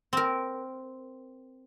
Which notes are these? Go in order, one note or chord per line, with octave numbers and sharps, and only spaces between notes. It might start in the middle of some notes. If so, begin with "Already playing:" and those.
C4 A#4